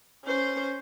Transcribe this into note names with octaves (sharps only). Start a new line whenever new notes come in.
C#4 C5